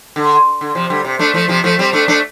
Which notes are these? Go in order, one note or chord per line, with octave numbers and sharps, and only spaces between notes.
D3
D3
C3 F3
D3 G3
C3
A3 D4
F3 A3
C3 F3
F3 A3
G3 C4
A3 D4
A3 D4